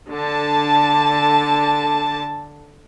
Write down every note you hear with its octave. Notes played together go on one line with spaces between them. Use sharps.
D3 A5